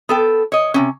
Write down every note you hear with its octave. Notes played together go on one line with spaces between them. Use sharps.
B3 A4 G5
C#5 D#5
C3 F3 C#4